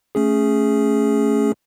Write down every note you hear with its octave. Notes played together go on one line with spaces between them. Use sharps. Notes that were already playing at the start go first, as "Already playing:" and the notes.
A3 C#4 G#4